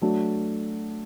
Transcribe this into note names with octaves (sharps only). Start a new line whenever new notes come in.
F#3 A3 D4